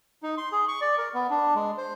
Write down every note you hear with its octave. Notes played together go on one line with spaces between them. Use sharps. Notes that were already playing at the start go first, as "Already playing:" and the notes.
D#4
C6
G#4
C#6
D5
A#4
B3
D4
G#3
C5